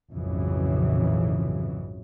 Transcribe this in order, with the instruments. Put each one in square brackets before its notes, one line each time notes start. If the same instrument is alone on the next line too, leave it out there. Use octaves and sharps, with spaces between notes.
[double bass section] A#1 F2 G#2 C#3 E3 F#3